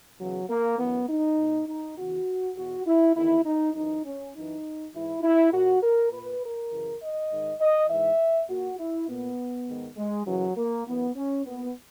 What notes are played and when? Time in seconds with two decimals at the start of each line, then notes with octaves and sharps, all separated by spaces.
0.19 E2 C#3 E3 F#3
0.49 A#3
0.78 F#2 E3 B3
1.08 D#4
1.38 A#2
1.68 D#4
1.97 E2 C#3 E3 F#4
2.56 E2 B2 F#4
2.86 E4
3.16 E2 D#3 E4
3.45 D#4
3.74 F#2 E3 D#4
4.04 C#4
4.34 F#2 E3 D#4
4.93 G#2 E3 E4
5.23 E4
5.52 A#2 F#4
5.83 A#4
6.12 A#2 B4
6.42 A#4
6.71 F#2 C#3 E3
7.01 D#5
7.31 G#2 D#3
7.60 D#5
7.90 G#2 E3 E5
8.48 A#2 F#4
8.79 E4
9.08 A#2 B3
9.67 G#2 D#3
9.97 G#3
10.26 F#2 C#3 E3 F#3
10.56 A#3
10.86 F#2 E3 B3
11.16 C#4
11.45 A#2 B3